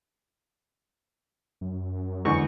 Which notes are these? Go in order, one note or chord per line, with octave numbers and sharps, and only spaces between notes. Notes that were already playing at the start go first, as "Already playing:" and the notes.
F#2
E2 D3 G#3 C#6